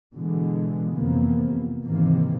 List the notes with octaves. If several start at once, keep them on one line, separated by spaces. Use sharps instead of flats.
B2 D3 E3 G#3
F2 C3 E3 A#3 B3
G#2 C3 D#3 E3 A#3